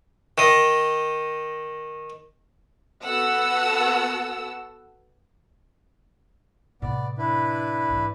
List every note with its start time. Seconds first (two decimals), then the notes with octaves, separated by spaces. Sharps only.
0.38 D#3 D#5
3.03 B3 F#4 A4 F#5 E6
6.82 A2 C3 B3 D5
7.18 D4 E4 B4
7.90 G#2 E3